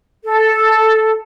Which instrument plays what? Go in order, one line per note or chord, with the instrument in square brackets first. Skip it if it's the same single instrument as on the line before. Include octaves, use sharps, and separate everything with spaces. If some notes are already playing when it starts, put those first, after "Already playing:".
[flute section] A4